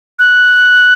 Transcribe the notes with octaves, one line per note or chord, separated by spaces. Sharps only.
F#6